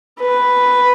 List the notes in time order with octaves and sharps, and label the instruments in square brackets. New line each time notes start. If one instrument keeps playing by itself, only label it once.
[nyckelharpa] B4